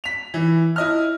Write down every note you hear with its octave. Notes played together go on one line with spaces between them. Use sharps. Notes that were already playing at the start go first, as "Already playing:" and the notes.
B6 F7
E3
E4 D#5 F6